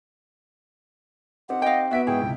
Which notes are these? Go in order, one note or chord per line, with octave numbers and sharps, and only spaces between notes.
C4 D#4 G4 F#5
D#5 F5 G5
B3 F#4 E5 B6 D7
G#2 E4 G#4 G5 C#6
C#2 C3 G#3